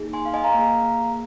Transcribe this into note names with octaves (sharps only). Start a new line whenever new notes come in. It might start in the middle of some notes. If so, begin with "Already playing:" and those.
Already playing: A#3 D#4 G#4
G#5 C6
F5
D#5 G#5
F5 A#5
A#3 G#4